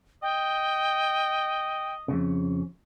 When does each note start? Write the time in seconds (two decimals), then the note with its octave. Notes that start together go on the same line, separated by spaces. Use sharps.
0.23 D#5 G5
2.08 F2 A#2 C#3